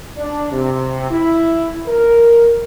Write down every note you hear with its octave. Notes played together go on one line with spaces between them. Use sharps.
D4
C3
E4
A#4